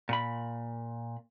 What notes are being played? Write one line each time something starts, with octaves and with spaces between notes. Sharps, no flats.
A#2 B5